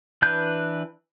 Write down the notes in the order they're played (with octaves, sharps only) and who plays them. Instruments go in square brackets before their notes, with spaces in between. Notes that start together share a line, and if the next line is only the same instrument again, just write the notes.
[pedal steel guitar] E3 D4 B4 G6